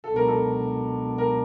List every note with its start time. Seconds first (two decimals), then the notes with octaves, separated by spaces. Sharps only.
0.04 C#2 B2 F#3 B3 D4 A4
0.16 A#4
0.28 A4
1.18 A#4